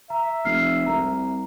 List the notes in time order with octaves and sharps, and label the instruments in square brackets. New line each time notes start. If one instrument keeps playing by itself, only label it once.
[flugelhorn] E5 [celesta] A#5
[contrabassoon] F1 [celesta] F6 C7
[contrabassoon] C2 [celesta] A#5